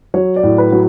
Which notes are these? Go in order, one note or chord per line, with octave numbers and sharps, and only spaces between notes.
F#3 C#5
D5
A2
B4
F#3